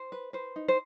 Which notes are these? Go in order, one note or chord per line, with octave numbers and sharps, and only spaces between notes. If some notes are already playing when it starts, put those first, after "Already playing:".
Already playing: C5
B4
B4 C5
D#4
C5